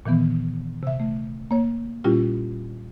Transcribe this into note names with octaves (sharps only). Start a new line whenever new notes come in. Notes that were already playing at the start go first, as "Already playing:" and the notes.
A#2 D#3 E3 B3
C3 E5
A3
A#3 C#5
A#2 G3 C#4 E4 F4 G4